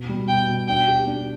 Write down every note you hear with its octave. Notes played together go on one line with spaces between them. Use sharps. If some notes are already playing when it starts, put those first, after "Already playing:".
Already playing: B2
G3
B2 G5
B2
D4 G5
G4
D4